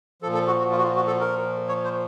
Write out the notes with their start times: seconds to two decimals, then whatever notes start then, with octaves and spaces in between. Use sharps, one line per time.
0.22 F3 A4
0.26 A#2
0.34 A4
0.47 F#4
0.59 F#4
0.71 F4
0.78 F#4
0.83 F4
0.96 F#4
1.07 A4
1.20 A#4
1.68 C#5
1.84 C5